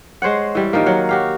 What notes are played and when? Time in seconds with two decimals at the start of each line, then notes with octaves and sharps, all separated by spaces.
0.22 G#3 C5 C#5 F#5
0.55 E3 G3
0.73 D#3 F3 A#3
0.86 F#3 F#5
1.09 F#4 G4 F5